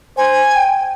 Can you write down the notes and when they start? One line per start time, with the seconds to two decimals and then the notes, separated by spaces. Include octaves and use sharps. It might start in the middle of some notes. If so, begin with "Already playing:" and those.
0.17 C5 G#5
0.55 G5